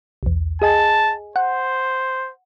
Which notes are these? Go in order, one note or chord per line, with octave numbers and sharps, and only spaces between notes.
B1 E2
G#4 D#5 G#5 A5
C5 F#5